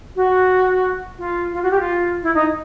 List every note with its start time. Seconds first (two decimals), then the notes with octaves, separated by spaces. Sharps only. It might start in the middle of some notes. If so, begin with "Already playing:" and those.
0.16 F#4
1.19 F4
1.53 F4
1.63 F#4
1.71 G4
1.80 F4
2.23 E4
2.35 D#4